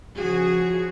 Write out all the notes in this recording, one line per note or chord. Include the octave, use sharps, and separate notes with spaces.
C#3 F3 F#4 G#4